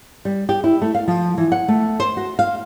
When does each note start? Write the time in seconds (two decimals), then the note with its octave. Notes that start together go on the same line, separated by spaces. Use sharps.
0.25 G3
0.49 G4
0.64 E4
0.82 A3
0.95 F5
1.08 F3
1.38 E3
1.52 F#5
1.68 A3
2.00 C5
2.17 F#4
2.39 F5